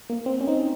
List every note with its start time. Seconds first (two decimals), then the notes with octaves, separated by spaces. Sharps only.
0.10 A#3
0.26 C4
0.41 C#4
0.48 C4 D#4